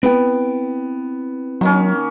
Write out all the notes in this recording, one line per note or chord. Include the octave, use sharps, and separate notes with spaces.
B3 C4 E4 G5
D#3 F#3 A#3 C#4